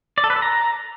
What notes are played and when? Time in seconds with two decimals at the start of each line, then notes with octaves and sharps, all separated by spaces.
0.18 D5
0.24 A4
0.30 B4
0.36 A4
0.42 A#5